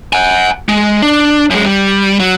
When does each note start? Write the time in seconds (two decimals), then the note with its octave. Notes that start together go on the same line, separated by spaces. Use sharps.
0.13 F#5 G#5
0.69 G#3
1.02 D4
1.50 F#2 G#3
1.66 G3
2.20 F#3